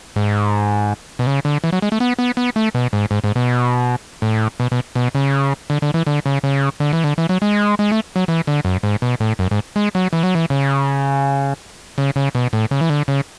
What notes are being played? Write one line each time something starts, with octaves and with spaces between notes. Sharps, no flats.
G#2
B2
C#3
D3
E3
F#3
G#3
A3
B3
B3
B3
A3
B2
G#2
G#2
G#2
B2
A2
B2
B2
B2
C#3
D3
D3
E3
D3
C#3
C#3
D3
E3
D3
E3
F#3
G#3
G#3
A3
F#3
E3
D3
F#2
G#2
B2
A2
F#2
G#2
G#3
F#3
E3
F#3
E3
C#3
C#3
C#3
B2
A2
C#3
E3
D3
C#3